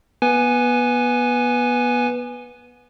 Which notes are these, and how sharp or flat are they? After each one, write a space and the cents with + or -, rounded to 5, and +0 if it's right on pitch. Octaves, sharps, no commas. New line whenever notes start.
B3 -30 B4 +0 G#5 +0